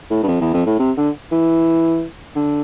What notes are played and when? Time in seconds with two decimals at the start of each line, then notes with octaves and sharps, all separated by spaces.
0.10 A2
0.23 G2
0.27 F2
0.41 E2
0.54 F2
0.66 A2
0.79 C3
0.97 D3
1.32 E3
2.36 D3